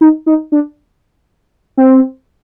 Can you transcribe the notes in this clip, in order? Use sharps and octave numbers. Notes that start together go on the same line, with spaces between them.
D#4
D#4
D4
C4